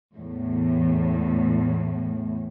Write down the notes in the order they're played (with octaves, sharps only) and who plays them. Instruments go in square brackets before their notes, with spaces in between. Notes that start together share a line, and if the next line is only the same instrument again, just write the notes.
[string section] E2 A2